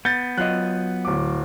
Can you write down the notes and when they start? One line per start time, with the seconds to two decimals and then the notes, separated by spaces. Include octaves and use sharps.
0.05 B3 G6 A6
0.38 F#3 F4 D#5 F#6
1.05 D1 D6